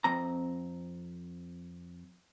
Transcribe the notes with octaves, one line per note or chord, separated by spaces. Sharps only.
F2 C4 A#5